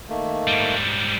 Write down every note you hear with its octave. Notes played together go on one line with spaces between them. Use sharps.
D#3 A3 A#3
G#2 G3